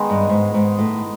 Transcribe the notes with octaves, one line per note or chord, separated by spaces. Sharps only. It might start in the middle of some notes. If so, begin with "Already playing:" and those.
Already playing: D#3 G#3 B3 D#4
G2
G#2
G#2
A2